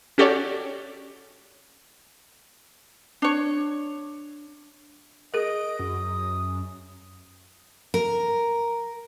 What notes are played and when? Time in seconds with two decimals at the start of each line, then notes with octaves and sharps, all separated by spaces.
0.18 C#4 F#4 G4 A4 C#5 D5
3.22 D4 C#5
5.34 G#4 A#4 D#5 D7
5.79 F#2 D#6
7.94 A#4